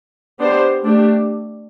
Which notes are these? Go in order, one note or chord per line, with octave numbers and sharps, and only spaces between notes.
B3 D4 G4 C5
A3 D4 G4